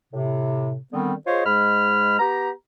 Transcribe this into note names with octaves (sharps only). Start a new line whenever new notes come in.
A2 C3
D3 D#3 G3 B3 C4
F4 G#4 C5 C#5 D#5
G#2 G#3 B5 F6
B3 G4 A#5